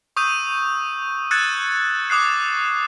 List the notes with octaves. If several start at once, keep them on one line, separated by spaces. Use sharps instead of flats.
C#6 D#6 E6 G6 D#7
E6 F#6 G#6 A6 C#7 E7
D6 D#6 F#6 C7